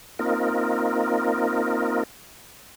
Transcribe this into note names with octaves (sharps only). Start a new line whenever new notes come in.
A#3 C4 D#4 F4 A#4